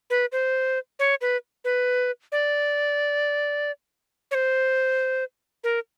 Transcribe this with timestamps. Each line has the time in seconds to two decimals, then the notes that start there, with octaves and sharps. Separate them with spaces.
0.10 B4
0.32 C5
0.99 C#5
1.21 B4
1.64 B4
2.32 D5
4.31 C#5
4.35 C5
5.64 A#4